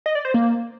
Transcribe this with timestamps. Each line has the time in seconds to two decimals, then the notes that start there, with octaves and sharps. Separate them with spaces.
0.06 D#5
0.15 D5
0.25 C5
0.34 A#3